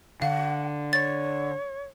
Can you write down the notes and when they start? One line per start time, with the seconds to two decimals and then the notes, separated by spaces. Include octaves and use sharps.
0.22 D3 F5 F#5
0.93 C#5 A6